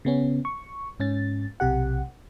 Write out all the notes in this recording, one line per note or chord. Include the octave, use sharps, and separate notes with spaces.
C#3 B3 C#4
C#6
G#2 C#4 A6
B1 C3 G4 F#5